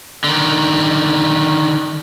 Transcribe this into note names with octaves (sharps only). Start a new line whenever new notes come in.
D3 D#3